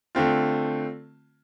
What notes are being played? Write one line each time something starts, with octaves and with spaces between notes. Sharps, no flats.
D3 A3 C4 F4